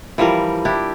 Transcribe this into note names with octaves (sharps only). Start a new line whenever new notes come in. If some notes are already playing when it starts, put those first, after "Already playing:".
E3 F3 G3 A#4
D4 E4 G4